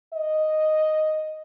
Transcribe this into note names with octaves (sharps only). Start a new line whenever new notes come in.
D#5